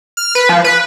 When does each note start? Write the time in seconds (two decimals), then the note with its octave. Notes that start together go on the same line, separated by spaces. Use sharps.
0.17 F6
0.35 B4
0.49 F3
0.64 B4